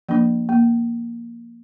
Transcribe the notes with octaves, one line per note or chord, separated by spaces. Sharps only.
F3 A#3 D4
A#3